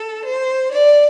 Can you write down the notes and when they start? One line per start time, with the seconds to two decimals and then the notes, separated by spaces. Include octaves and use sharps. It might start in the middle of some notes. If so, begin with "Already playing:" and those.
Already playing: A4
0.25 C5
0.71 D5